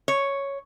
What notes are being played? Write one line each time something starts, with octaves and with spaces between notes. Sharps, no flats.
C#5